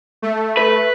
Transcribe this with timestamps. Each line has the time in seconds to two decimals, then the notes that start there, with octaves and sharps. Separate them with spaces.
0.22 A3
0.57 B4